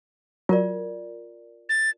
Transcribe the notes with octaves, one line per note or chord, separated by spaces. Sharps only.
F#3 F4 A#4 D5
A6